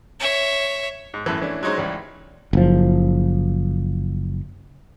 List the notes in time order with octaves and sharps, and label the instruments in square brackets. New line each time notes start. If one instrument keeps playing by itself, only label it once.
[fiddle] C#5 E5
[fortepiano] G#2
F#2 A2 E3
E3 A3 C#4 D4
F#3 G#3 C#4 D#4 C5 C#5
C#2 E3 G3 C#5
[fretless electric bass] F#1 F3